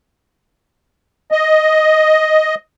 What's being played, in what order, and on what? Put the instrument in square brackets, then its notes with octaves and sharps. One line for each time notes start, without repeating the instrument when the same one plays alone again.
[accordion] D#5